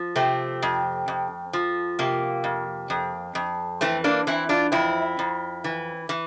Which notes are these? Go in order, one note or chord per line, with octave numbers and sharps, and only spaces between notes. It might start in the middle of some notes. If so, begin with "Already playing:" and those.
Already playing: F3
C3 A3 C4
F2
F2
F3
C3 A#3
F2
F2
F2
E3 A3 C4
A#3 D4
E3 C4 E4
D4 F4
F2 C4 E4
F2
E3
E3